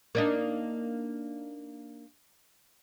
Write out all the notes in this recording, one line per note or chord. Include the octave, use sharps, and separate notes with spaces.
A#3 D4 D#4